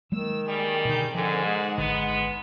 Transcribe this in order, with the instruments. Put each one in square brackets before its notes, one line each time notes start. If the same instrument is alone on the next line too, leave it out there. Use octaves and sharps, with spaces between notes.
[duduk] D#3 [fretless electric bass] F#3 G#3 A#3 [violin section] E6
[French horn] G3 [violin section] G#4 G5
[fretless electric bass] B2 D3 [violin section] D#4 G#4 G6
[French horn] G#2 [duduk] D3 [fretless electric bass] F3 [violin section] C4 G#4 A#4
[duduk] G#3 [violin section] D#4 G#4 F#5
[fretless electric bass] G#1 D3 [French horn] B3